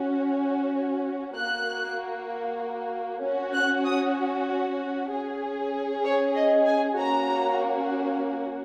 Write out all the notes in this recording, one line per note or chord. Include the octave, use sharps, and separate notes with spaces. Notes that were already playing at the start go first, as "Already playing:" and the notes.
Already playing: C#4 F#4
A#3 F#4 F#6
C#4 F#4
F#6
D#6
C#4 G#4
C#5
D#5
G#5
A#3 C#4 F#4 A#5